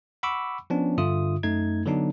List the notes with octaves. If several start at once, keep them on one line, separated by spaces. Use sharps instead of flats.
F#5 B5 C#6 D6 E6
F3 B3 C#4 D4
G2 D3 F4 E5 D#6
F#2 A3 D#4 G#6
D3 F#3 B3 D4 D#4